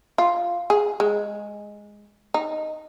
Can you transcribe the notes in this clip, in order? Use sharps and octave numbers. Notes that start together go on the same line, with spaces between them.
F4
G#4
G#3
D#4